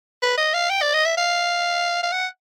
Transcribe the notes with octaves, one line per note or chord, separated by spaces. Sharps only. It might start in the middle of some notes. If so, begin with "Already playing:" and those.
B4
D#5
F5
G5
D5
D#5
E5
F5
F5
F#5